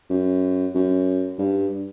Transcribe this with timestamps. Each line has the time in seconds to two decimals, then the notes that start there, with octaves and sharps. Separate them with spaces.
0.10 F#2
0.74 F#2
1.39 G2